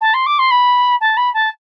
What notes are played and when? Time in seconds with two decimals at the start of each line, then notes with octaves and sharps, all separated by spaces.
0.01 A5
0.14 C6
0.26 D6
0.39 C6
0.51 B5
1.01 A5
1.17 B5
1.34 A5